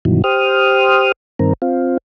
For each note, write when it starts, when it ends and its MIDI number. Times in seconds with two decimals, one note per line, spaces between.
0.05 0.22 43
0.05 0.22 47
0.05 0.22 51
0.05 0.22 52
0.05 0.22 54
0.24 1.12 67
0.24 1.12 72
0.24 1.12 87
0.24 1.12 89
1.39 1.53 43
1.39 1.53 51
1.39 1.53 60
1.39 1.53 70
1.62 1.98 60
1.62 1.98 65